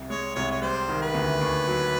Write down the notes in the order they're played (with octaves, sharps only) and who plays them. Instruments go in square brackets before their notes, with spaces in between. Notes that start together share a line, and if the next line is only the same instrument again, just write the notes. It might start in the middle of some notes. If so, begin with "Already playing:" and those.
Already playing: [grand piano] C2
[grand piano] G#3 [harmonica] C#5
[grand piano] C2 [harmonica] C#5
[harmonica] C#5
[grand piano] G3 [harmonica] C5
[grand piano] D#3
[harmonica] B4
[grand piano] D2
D#2
F#3